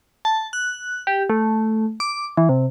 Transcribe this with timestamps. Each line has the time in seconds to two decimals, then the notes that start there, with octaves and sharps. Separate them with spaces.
0.25 A5
0.53 F#6
1.07 G4
1.30 A3
2.00 D6
2.37 E3
2.49 C3